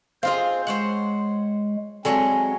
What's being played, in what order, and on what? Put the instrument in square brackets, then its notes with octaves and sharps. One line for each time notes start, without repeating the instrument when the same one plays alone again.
[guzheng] C4 F4 G#4 [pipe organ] C5 [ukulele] D#5 F5
[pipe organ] G#3 [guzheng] C5 C#5 F#5
[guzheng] F#3 G#3 C#5 [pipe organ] C4 [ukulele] A4 D5 A5 [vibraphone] G#5